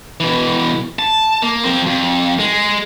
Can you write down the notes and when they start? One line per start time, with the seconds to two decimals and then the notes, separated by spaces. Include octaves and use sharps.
0.20 B2 E3
0.99 A5
1.42 A#3
1.65 F3 C4
1.86 F2
2.40 G#3